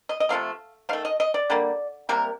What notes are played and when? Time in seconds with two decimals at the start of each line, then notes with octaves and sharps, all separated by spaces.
0.09 D#5
0.20 D#5
0.29 C3 F3 A3 F5
0.89 D#3 A3 F5
1.05 D#5
1.20 D#5
1.34 D5
1.50 D3 G3 A#3
2.09 C3 G3 A#3 A#4